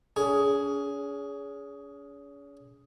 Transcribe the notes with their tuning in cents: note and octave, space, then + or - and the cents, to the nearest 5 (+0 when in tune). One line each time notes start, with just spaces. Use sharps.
C#4 +40 G#4 +5